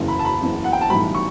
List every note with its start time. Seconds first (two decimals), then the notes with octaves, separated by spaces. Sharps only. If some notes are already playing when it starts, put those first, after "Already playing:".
Already playing: F#1 E2 C#3
0.08 B5
0.19 A5
0.25 B5
0.41 F#1 E2 C#3
0.64 F#5
0.73 G5
0.81 A5
0.90 B1 A2 E3 G3 B5
1.15 C#6